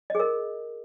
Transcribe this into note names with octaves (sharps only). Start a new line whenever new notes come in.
G#4 A#4 D#5